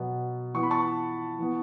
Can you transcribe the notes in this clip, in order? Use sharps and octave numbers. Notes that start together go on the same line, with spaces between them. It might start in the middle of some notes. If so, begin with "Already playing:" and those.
Already playing: B2 F#3 B3
E3 B3 C#6
B5
A5 C#6
E3 B3